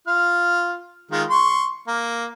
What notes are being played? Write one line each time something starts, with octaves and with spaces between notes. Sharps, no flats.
F4 F6
D#3 G#3 F4
C6 C#6
A#3